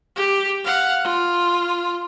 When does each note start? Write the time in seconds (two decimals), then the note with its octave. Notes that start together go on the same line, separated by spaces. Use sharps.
0.16 G4
0.65 F5 F#5
1.04 F4